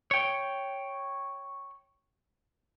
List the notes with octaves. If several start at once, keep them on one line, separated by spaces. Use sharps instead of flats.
C#5 G5